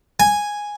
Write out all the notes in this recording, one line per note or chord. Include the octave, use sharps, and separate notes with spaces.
G#5